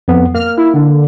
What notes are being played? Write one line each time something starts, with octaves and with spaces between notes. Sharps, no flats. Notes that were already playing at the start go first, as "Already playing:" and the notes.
F2 B3
A#3 F6
E4
D3